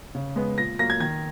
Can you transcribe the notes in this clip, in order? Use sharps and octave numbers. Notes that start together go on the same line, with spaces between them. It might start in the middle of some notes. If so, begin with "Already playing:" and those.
C#3
G#3 B3
A#2 A#6
F#3 A#3 A#6
G#6
D#3 G#6